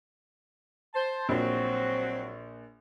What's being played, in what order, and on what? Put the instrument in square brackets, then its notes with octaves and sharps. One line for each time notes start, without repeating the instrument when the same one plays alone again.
[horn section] C5 A5
[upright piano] A#1 [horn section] F#3 C4 F#4